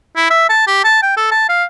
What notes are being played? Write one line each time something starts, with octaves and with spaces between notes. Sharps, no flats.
E4
E5
A5
G4
A5
G5
A4
A5
F5